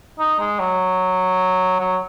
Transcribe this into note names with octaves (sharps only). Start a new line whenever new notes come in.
D#4
G#3
F#3
F#3